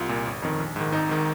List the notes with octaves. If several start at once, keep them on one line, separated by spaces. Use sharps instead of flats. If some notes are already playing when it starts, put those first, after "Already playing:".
Already playing: C2 F4
A#2
G1
F2 D#3
A#1
G#2 D#3
G#1 D#4
G#2 D#3